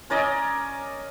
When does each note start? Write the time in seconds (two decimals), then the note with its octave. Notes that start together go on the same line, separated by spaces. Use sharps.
0.10 C#4 A#4 D5 D#5